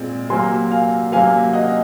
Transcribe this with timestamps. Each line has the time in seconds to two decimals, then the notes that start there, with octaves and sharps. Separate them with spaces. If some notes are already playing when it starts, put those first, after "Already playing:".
Already playing: A#2 G#3 C4
0.30 C3 F#3 A#3 G#5 C6
0.71 F5 G#5
1.12 C3 F#3 A#3 F5 G#5
1.53 D#5 F#5